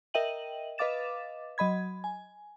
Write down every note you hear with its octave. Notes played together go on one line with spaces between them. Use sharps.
A#4 D#5 E5 G5 D#7 F#7
B4 D#5 F5 D6 A6 E7
F#3 D#5 B5 G#6
G#5